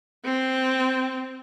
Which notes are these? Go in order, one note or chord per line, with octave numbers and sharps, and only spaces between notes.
C4